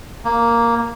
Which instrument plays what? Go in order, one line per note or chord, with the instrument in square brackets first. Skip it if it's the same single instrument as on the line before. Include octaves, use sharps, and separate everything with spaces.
[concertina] A#3